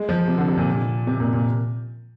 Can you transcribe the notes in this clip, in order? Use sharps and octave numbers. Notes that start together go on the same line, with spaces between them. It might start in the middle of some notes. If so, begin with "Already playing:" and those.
Already playing: G#3
F3
C3
D3
C3
A#2
C3
A#2
A#2